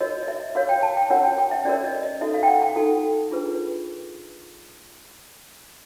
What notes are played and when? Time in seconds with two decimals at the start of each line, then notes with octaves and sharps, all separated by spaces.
0.01 F#4 A#4 C#5 D#5
0.23 D#5
0.28 E5
0.55 F#4 A#4 C#5 F5
0.69 G5
0.83 A5
0.97 G5
1.10 C#4 F#4 A#4 C#5 F#5
1.24 G5
1.38 G5
1.51 E5
1.65 C#4 F#4 A#4 C#5 D5
1.84 D#5
2.03 D#5
2.21 D#4 F#4 A4 E5
2.34 F5
2.43 G5
2.48 F#5
2.62 G5
2.76 D#4 F#4 A4
3.31 D4 F4 G#4 B4